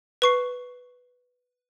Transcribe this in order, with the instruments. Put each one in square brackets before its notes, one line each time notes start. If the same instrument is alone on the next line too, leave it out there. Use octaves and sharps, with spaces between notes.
[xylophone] B4 C#6 C7